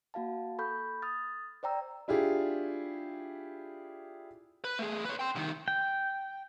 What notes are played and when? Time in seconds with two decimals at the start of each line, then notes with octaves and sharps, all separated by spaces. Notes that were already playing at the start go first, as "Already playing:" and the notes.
0.14 A#3 F#4 F5 A5
0.59 A4 B5 C#6 F6 G6
1.02 D#6 F6 A6
1.63 C5 D5 G5 A#5 E6
2.08 D4 E4 F4 G4 G#4
4.64 B4
4.79 A3 G#4
5.05 B4 C#5
5.19 G5 C6
5.35 C2 D#3
5.68 G5